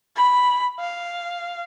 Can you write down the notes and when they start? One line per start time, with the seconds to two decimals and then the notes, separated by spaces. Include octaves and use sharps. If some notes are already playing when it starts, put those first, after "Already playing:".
0.16 B5
0.80 F5